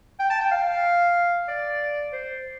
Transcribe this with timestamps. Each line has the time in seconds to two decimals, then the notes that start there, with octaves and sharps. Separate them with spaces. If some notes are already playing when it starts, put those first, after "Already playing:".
0.20 G5
0.30 A5
0.41 G5
0.52 F5
1.48 D5
2.13 C5